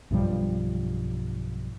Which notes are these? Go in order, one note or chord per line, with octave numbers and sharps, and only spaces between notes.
B1 G2 F3 G3